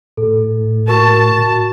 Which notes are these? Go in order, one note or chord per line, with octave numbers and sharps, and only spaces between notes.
A2 A4
F#4 A#4 A5 C#6